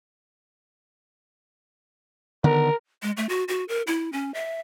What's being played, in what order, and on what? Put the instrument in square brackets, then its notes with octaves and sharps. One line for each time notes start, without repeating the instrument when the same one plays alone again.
[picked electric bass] D3 D#3 B3 [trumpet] A#4
[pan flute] G#3
A3
F#4
F#4
A#4
E4
C#4
E5